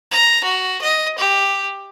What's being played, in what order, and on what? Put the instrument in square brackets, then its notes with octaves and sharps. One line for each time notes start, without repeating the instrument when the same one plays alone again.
[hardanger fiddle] A#5
F#4
D#5
G4